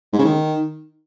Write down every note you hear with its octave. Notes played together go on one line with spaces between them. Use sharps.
G#2
C#3
D#3